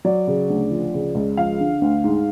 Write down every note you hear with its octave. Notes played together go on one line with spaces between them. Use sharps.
F#3 D5
C#3
D2
F3
C#3
C#2
F3 F5
D3
D2
G#2